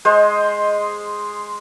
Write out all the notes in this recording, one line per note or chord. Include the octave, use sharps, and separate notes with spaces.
G#3 C5 D#5